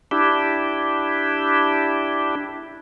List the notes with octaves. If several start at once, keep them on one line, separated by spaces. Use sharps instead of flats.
D4 E4 G4